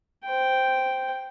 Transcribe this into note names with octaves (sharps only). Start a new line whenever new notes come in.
C5 G5